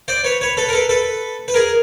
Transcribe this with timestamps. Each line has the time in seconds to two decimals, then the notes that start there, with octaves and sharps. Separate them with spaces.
0.08 C5 D5
0.24 B4 C#5
0.41 B4 C#5
0.57 A4 B4
0.69 A#4
0.73 A4 B4
0.89 A4 B4
1.48 B4
1.54 G#4 A#4